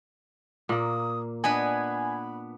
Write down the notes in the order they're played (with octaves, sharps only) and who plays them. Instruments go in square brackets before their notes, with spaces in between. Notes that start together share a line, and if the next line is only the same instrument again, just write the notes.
[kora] A#2 A#3 [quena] D#6
[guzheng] B3 D4 B4 [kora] D#5 [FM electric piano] G#5 G#6 [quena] B5